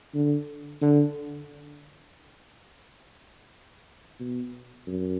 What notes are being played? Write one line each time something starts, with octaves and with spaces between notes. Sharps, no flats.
D3
D3
B2
F#2